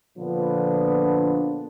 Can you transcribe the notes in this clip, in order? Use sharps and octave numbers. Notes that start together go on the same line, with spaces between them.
A#2 D3 F3 B3 D4 F4